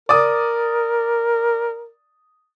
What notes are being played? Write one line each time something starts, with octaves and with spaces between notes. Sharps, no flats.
A#4 D5 D6 D#6